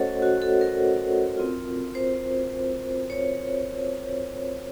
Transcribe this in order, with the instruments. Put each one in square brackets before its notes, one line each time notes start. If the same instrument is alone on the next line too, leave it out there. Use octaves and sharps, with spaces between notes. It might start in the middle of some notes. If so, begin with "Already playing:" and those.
Already playing: [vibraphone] A3 C#4 F#4 A4 C5 C#5 D#5 F#5
F#4
A4
A#4
C4 F4
C5
C#5